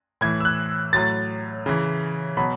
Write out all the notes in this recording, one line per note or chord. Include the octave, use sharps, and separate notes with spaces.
A2 E3 G#6
E6
F#6
A2 F#3 A6
C#3 E3
B2 F#3 B5